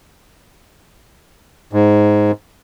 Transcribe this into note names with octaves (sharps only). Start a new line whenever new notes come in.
G#2